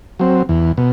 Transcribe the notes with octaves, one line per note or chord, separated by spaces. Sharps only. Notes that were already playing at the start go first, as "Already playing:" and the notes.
F#3 C4
E2
B2